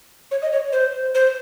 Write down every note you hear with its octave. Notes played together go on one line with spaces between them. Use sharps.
C#5
D#5
C#5
C5
C5